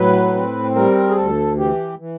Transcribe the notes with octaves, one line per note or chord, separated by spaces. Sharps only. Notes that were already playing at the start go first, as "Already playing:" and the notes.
Already playing: A2 F#3 B4
C4
G3 A#4
G#4
D2 A4
E3 G4
E3